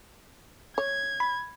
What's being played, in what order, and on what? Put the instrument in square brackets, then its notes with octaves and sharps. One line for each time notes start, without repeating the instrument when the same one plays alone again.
[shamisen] C#5 [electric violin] G#6
[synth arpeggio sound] B5